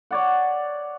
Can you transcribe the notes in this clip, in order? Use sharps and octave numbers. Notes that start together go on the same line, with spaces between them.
C#5 D5 F#5